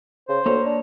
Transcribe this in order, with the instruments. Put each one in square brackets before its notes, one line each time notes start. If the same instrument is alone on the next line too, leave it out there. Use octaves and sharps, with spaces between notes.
[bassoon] C#3 [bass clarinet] C5
[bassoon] D2 [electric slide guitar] A#3 C#5
[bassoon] D4